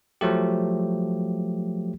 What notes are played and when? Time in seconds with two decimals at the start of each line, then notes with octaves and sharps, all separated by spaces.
0.21 F3 F#3 A3 G4